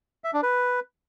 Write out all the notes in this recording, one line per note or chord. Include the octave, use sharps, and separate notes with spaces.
E5
D4
B4